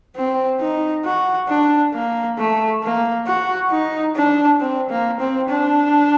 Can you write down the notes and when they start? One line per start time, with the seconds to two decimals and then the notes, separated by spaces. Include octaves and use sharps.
0.16 C4
0.60 D#4
1.05 F#4
1.48 D4
1.94 A#3
2.38 A3
2.83 A#3
3.26 F#4
3.71 D#4
4.16 D4
4.60 C4
4.90 A#3
5.20 C4
5.49 D4